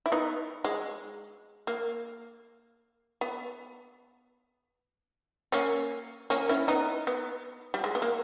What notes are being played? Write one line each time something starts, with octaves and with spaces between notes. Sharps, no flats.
E4
B3 D#4
G#3
A#3
B3
A#3 C#4
A#3 C#4
C#4 E4
B3 D#4
B3
G3
G#3
B3
A#3